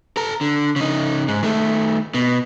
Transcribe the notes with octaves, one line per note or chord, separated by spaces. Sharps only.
A4 A#5
D3
C#3 D#4
G#2
D#3 A3
B2